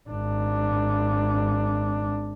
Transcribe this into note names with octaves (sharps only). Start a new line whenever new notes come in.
G#1 D4